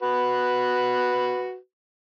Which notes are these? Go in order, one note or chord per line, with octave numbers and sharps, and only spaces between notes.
F#4 B4